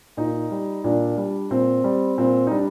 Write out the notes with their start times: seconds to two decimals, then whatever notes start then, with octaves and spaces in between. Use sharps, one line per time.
0.17 A#2 D#4
0.51 G3
0.84 A#2 D4
1.17 G3
1.51 A#2 C4
1.84 G3
2.18 A#2 C4
2.47 D#4
2.51 G3 D4